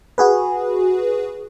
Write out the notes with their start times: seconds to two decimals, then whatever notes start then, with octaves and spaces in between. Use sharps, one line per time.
0.18 F#4 G#4 B4